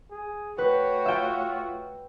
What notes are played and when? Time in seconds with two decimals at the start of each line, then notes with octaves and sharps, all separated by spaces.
0.11 G#4
0.58 A3 F#4 B4 C#5 G5
1.05 F4 E5 G5